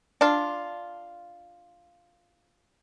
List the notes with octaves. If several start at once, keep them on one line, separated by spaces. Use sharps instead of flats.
D4 F4